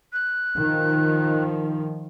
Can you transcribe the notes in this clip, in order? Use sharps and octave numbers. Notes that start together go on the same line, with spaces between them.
F#6
D#3 F3